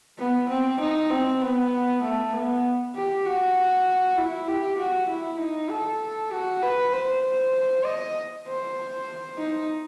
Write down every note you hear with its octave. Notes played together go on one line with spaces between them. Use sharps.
B3
C4
D#4
C4
B3
A3
B3
G4
F#4
E4
G4
F#4
E4
D#4
A4
F#4
B4
C5
D#5
C5
D#4